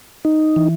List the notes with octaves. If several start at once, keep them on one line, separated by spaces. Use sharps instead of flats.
D#4
E3